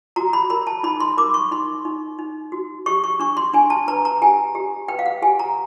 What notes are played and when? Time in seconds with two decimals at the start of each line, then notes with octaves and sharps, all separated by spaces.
0.16 F#4 A#5
0.33 B5
0.50 A#4 B5
0.67 A5
0.83 D#4 B5
1.00 C6
1.18 A#4 D6
1.34 C#6
1.51 D#4 C6
1.85 D#4
2.19 D#4
2.52 F#4
2.86 G4 C#6
3.04 C#6
3.20 D4 C#6
3.37 C6
3.54 D4 G#5
3.70 A5
3.88 B4 A#5
4.05 A#5
4.22 G4 G#5
4.55 G4
4.88 B4 G5
4.99 F5
5.06 F#5
5.22 G4 G#5
5.39 A#5